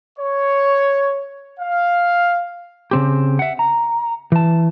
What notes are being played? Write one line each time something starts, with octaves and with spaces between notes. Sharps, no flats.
C#5
F5
C#3 C4 G4
E5 F#5
A#5
E3 A5